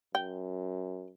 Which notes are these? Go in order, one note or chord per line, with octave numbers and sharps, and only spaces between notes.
F#2 G5